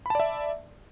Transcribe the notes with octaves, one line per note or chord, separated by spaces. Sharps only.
D5 E5 A5 B5